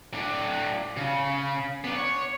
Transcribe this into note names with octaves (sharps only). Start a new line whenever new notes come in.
A2 D4
C#3
B3 D4
C#5